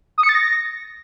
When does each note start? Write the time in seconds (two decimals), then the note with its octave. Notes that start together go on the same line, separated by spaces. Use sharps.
0.18 D#6
0.23 C#7
0.29 A6
0.35 A#6